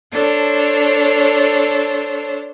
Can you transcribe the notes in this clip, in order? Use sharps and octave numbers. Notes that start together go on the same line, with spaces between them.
D4 A4 C5 C#5